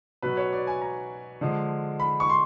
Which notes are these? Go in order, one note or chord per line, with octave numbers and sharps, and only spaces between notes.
B2 F#3 B4
C#5
D5
G#5
A#5
D3 F3 G#3
B5
C#6
C6